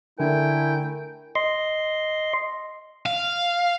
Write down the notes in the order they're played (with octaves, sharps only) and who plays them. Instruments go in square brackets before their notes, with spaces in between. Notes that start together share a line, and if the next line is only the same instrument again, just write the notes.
[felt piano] D3 [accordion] A3 E4 G#5 [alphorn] A#4 [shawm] G5
[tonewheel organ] D#5 C6
[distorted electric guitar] F5